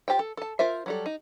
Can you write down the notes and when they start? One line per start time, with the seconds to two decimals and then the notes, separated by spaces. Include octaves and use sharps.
0.08 F4 G4 C5 G5
0.19 A4
0.37 A4 A5
0.59 F4 A#4 C5 E5
0.86 F#3 G3 A4
1.06 D#4